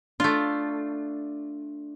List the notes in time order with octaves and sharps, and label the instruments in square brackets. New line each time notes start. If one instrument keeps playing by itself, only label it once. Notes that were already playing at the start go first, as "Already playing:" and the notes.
[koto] A3 F4 [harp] D4